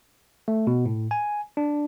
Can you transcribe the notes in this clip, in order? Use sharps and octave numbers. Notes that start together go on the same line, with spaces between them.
A3
B2
A2
G#5
D4